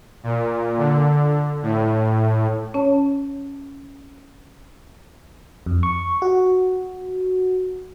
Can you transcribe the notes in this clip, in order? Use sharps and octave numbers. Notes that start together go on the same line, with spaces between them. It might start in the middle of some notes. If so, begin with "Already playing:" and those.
A#2
D3
A2
C#4 C#5 A5
F2
C#6
F#4